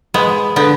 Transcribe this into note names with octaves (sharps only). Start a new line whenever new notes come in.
G#3 B3
D3 B3